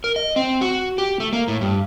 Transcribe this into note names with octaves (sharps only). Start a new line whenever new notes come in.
A#4
D#5
C4
F#4
G4
A3
A#3
A2
G2